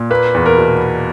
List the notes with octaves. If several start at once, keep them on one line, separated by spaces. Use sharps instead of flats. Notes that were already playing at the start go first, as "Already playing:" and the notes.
Already playing: A#2
A#3 B4
E2
A#4
B2